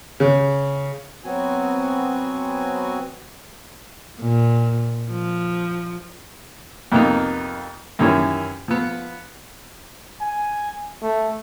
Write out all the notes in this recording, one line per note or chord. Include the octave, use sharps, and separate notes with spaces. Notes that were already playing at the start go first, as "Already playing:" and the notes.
C#3
F#3 B3 C4 F#4 G#5
A#2
F3
F2 C3 A#3 B3 D#4
F#2 D#3 E3 G3 C#4 E4
F3 B3
G#5
A3